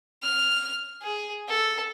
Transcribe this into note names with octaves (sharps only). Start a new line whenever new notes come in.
F6
G#4
A4